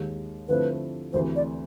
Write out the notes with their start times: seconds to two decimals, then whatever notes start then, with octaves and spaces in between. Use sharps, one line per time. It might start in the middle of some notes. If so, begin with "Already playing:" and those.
Already playing: D#2 D#3 G#3
0.49 D3 F3 A3 C4 E4 B4
1.13 D2 C3 E3 A3 C5
1.36 D5